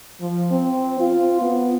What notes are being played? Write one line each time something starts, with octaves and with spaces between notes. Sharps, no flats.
F3
C4
F4
B3